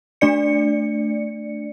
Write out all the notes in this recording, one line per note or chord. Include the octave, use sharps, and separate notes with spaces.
A3 D4 D5 C#7